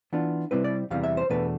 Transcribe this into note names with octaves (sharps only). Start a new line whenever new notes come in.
E3 B3 D4 F4
C3 G3 C4 E4 B4
D5
E2 C3 E3 G3 F5
E5
C5
E2 B2 A3 D4 B4